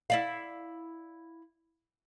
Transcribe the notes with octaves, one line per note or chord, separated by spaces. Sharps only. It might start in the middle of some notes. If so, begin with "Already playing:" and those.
E4 D5 F5